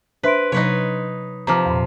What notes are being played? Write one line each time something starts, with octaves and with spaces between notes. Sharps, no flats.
D4 B4 C5 E5 C6 D7
C3 F#3 D#4 B4 C#5
C3 F3 A#5 D6 F6
E2 A#2